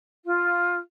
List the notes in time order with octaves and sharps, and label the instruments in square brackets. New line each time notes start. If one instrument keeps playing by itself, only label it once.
[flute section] F4